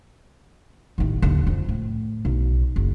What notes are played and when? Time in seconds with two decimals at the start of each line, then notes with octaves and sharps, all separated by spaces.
0.98 A1 D#3
1.22 D#1 D3
1.47 F2
1.69 A2
2.25 B1
2.76 F#1